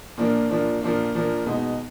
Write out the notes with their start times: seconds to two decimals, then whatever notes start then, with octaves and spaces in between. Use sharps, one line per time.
0.17 A#2 F3 A#3 D4
0.49 A#2 F3 A#3 D4
0.82 A#2 F3 A#3 D4
1.15 A#2 F3 A#3 D4
1.46 B2 G#3 D#4